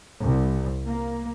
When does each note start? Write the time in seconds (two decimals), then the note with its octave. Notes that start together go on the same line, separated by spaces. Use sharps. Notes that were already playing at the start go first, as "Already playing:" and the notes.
0.21 C2
0.85 A#3